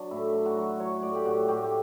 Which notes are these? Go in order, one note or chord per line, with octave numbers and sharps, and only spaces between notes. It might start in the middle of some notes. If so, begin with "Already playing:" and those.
Already playing: F#3 D4
A2 E4
F#3
F#4
F#3
F#3 C#5
A2 D5
G4
A2 F#4
A2 G4
G4